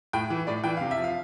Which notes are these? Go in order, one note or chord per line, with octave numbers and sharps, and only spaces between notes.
A2 G5
E3
A2 D5
E3 G5
C3 F5
E5
F3
F5